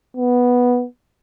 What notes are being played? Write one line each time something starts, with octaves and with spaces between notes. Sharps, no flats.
B3